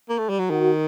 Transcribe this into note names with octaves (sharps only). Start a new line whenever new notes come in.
A#3
A3
G3
F#3
D#3 F#4